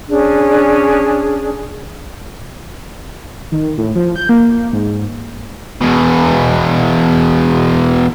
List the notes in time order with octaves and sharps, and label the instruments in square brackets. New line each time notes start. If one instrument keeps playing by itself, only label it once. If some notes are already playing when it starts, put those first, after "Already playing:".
[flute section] C#4 D4 G#4
[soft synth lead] D#3
A2
F3
G6
A#3
G#2
[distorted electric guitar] E2 B2